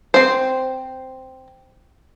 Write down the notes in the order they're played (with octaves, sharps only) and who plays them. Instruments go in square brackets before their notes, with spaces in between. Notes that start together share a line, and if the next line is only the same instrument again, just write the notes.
[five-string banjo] C4 C5